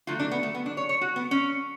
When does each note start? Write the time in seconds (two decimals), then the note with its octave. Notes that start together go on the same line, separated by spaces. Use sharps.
0.07 D3 F#3 A3 F4
0.19 D4
0.31 B3
0.43 A3
0.54 B3
0.66 D4
0.77 C#5
0.89 C#5
1.01 F#4
1.16 B3
1.31 C#4